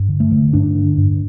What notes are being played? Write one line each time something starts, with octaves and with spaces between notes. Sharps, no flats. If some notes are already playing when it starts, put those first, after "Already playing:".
Already playing: G2
D3
A3
D3
G2 D4
D3
G2